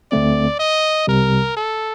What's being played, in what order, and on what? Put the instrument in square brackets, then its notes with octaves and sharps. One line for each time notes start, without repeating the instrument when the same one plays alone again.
[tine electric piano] D2 D3 A3 C4 [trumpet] D5
[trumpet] D#5
[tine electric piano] C2 C3 G3 [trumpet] A#4
[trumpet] A4